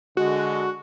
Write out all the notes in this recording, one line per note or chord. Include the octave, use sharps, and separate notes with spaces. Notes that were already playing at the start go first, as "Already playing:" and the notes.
D3 G#3 F#4